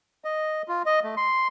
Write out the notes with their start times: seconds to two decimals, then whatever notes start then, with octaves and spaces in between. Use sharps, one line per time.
0.24 D#5
0.68 F4
0.86 D#5
1.04 A3
1.17 C6